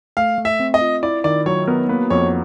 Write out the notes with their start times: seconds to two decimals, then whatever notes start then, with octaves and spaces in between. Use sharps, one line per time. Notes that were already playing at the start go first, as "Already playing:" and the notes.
0.17 A3 F5
0.38 A3
0.45 E5
0.60 C4
0.74 D#5
0.81 F4
1.03 E4 D5
1.24 D#3 D5
1.46 F#3 C#5
1.67 B3 A#4
1.89 A#3 B4
2.10 F2 C#5